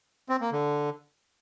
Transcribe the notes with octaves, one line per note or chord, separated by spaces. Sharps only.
C4
A#3
D3